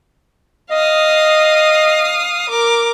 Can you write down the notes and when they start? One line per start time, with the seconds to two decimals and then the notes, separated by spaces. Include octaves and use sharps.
0.71 D#5 F5 D#6
2.50 A#4 D6